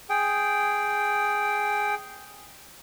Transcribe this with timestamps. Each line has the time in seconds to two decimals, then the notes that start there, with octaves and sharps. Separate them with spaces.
0.10 G#4 G5